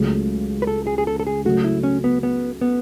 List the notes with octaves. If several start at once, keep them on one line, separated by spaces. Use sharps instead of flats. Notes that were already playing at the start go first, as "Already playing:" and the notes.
Already playing: C#2 C#3 F#3 A3
B4
A4
G#4
G#4
A4
A4
G#4
C#3 F#3 A3 F#4
E4
C#4
B3
B3
B3